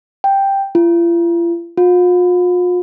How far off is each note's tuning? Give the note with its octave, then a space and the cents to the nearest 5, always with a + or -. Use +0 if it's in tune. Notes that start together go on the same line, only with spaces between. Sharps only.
G5 +5
F4 -45
F4 +40